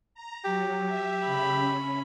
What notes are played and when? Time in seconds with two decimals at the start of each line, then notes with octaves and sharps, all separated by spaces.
0.14 A#5
0.45 F#3 G4
0.86 E5
1.26 C#3 E5 B5
1.60 C#4